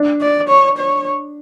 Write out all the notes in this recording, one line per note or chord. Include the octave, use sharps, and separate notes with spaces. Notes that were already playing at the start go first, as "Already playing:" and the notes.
Already playing: D4
D5
C#5
C#5